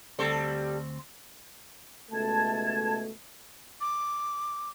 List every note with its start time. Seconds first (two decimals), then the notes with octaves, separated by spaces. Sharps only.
0.19 D2 G3 C4 A4
2.11 C#2 B2 A3 A5 G#6
3.81 D6